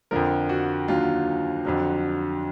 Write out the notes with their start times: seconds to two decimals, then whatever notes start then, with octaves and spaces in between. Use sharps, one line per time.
0.11 F2 D3 F3 A#4
0.49 F#4
0.88 D#2 D3 F#3 F4
1.65 F2 D3 F#3